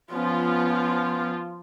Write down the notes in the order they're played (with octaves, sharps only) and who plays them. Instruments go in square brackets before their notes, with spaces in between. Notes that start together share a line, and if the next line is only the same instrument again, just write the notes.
[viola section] F3 F4 [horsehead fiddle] B3 C#4